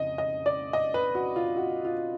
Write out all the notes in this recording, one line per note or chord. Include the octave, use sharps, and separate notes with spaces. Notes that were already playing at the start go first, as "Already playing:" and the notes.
Already playing: F2 C#3 D#5
D#5
D5
D#5
B4
F#4
F4
F#4
F4